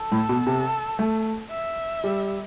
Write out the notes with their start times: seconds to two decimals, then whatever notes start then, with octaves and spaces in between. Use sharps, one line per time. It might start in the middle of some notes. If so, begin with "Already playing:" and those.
Already playing: A4
0.12 A2
0.29 B2
0.46 C3
0.99 A3
1.51 E5
2.04 G3